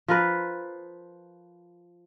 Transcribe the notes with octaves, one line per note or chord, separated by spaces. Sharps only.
F3 A#4 B4